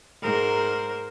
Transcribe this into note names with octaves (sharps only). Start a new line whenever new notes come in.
G#2 A#4 C5